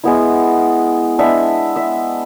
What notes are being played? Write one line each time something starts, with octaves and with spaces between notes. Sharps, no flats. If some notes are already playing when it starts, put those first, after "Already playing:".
G#3 B3 E4
G#3 B3 D4 E5
E5